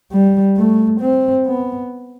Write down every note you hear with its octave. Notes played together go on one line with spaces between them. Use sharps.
G3
A3
C4
B3